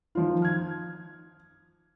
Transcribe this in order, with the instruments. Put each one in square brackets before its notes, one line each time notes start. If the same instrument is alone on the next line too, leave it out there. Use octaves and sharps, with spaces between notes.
[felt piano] D#3 F3 F4
F6 G#6